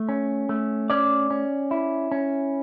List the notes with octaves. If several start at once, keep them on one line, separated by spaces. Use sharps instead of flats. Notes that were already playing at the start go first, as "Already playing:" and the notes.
Already playing: A3
C#4
A3
C#4 D5
C#4
E4
C#4